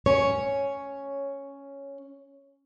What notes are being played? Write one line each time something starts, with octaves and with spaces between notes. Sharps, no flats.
C#4 C#5